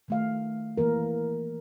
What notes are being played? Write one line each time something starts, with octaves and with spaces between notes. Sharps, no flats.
D#3 A3 F5
E3 A#3 A#4